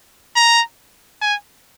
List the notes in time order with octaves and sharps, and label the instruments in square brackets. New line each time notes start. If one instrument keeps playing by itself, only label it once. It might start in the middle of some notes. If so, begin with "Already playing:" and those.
[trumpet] A#5
G#5